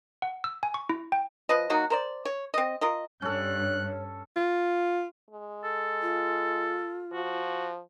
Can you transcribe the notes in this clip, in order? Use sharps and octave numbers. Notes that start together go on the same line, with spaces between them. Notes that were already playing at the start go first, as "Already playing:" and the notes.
F#5
E6
G#5
C#6
E4
G5
F3 B4 D#5
F#3 A#3 D#4 F#4
A#4 C5 D5
C#5
C4 D#5
F4 A#4 D#5
G2 C#4 A4 C#5 F#6
F4
G#3
A4
F4
F3 F#4